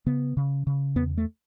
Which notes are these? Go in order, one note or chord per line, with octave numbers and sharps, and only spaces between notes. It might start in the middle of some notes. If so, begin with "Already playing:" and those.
C#3 B3
C#3
C#3
E2 B3
A3